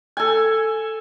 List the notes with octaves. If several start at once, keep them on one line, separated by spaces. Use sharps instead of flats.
A4 G#5